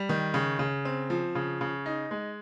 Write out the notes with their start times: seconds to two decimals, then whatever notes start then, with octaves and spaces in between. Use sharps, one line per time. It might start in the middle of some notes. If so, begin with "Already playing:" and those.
Already playing: G3
0.09 D#3
0.34 C#3
0.59 C#3
0.85 C4
1.10 F3
1.35 C#3
1.61 C#3
1.86 D#4
2.11 G#3